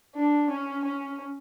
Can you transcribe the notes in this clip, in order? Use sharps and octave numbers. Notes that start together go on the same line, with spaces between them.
D4
C#4
C#4